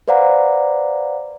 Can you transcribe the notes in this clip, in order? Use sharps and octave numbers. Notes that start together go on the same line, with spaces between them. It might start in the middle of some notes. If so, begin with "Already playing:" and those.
B4 C5 D5 F5 F#5 A#5